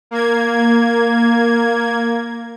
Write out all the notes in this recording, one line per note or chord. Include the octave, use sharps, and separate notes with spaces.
A#3 G#6